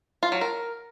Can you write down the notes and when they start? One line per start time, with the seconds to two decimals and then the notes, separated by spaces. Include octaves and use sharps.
0.23 F4
0.32 F#3
0.41 A#4